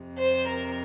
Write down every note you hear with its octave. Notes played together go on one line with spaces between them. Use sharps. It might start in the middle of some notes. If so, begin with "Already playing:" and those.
Already playing: F2 C3
C5
A#4